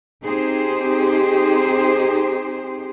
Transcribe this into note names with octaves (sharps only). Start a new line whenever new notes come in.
C4 D#4 G4 G#4 C5